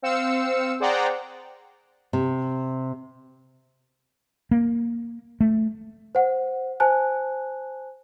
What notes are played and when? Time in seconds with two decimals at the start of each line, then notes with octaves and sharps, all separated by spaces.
0.02 C4 C5 F5 E6 C#7
0.80 G#4 C5 D5 F#5 G5 A#5
2.13 C3
4.51 A#3
5.40 A3
6.15 C5 F#5
6.80 C5 G#5 A5 F#6